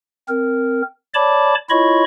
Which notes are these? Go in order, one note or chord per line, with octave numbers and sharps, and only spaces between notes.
C4 A#4
C#5 D5 A5 B5 D6
E4 F4 C#5 D#5 B5 C#6